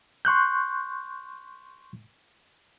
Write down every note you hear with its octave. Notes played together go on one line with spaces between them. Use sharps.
C6 C#6 F#6 G6